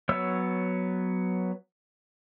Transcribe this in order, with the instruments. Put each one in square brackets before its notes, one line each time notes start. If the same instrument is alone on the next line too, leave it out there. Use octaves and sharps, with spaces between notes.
[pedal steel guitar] F#3 B3 C#5 E6